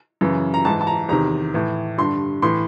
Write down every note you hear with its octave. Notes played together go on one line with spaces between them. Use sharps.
F#2 C#3 E3
A#5
G#2 E3 A5
A5
A#5
E2 C3 D#3 A#5
A2 E3
G2 D3 C6
A2 E3 C6